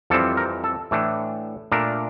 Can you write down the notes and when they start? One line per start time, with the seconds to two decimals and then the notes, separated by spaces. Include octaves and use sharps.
0.10 F2 E3 G3 C4 A4
0.37 A#4
0.64 A4
0.91 A2 E3 A3 D4
1.72 A#2 A3 D4 A#4